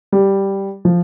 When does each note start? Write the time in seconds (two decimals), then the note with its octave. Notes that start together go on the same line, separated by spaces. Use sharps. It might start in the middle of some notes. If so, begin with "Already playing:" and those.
0.12 G3
0.85 F3